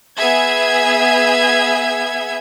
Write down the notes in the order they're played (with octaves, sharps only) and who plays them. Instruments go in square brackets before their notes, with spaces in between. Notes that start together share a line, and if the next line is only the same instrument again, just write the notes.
[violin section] B3 G#4 E5 G#6